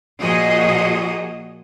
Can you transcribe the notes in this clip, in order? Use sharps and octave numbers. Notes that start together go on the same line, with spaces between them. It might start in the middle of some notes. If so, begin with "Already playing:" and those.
A#2 F3 F#4 G#4 D#5